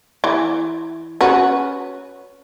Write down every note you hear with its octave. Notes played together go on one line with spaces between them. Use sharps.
E3
C#4 F#4 B4